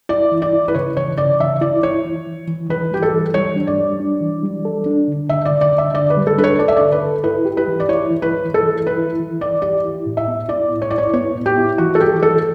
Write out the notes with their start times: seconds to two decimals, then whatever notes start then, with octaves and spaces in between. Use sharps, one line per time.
0.09 E4 D5
0.32 E3
0.42 D5
0.53 E4
0.68 B4
0.74 C#3 C#5
0.97 E3 C#5
1.18 C#3 D5
1.40 E3 E5
1.61 E4 D5
1.83 E4 C#5
2.04 E3
2.27 E3
2.48 E3
2.69 E3 B4
2.91 G3 G4
3.02 A4
3.13 E3
3.34 G3 C#5
3.56 D4
3.67 D5
3.78 G3
4.00 D4
4.21 E3
4.43 G3
4.65 A4
4.86 D4
5.08 D3
5.29 D3 E5
5.45 D5
5.52 D3
5.61 D5
5.73 D3
5.78 E5
5.94 D3 D5
6.10 B4
6.17 G3
6.27 A4
6.38 D4 B4
6.44 C#5
6.59 A4 D5
6.68 E5
6.77 D3 D5
6.92 B4
7.02 A4
7.24 E4 B4
7.45 G4
7.57 B4
7.67 E3
7.80 D5
7.89 E4 C#5
8.11 E3
8.22 B4
8.32 E3
8.54 E3 A4
8.75 E4
8.87 B4
8.97 E4
9.20 E3
9.41 E3 D5
9.62 G4 D5
9.84 E4
10.06 A2
10.17 E5
10.28 B3
10.49 E4 D5
10.70 A2
10.82 C#5
10.91 E4 D5
10.98 C#5
11.14 B3 C#5
11.35 A2
11.46 G4
11.57 E4
11.78 E3 F#4
11.95 A4
12.01 E3 G4
12.22 E3 A4